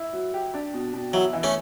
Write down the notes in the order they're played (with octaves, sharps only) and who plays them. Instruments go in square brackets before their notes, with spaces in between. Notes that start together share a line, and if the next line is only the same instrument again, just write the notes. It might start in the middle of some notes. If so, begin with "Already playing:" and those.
Already playing: [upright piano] E4
F#3
G4
D4
B2
B2
[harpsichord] F#3 [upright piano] E4
[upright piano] E3
[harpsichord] A3 C#4